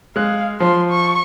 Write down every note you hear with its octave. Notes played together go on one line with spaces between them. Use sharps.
G#3 F5 F#6
F3 C6
C#6